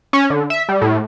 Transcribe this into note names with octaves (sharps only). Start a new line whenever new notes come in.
C#4
D3
E5
G3
A2